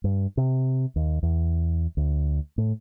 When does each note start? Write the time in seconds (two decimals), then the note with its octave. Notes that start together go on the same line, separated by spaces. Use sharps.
0.04 G2
0.37 C3
0.96 D#2
1.23 E2
1.97 D2
2.58 A2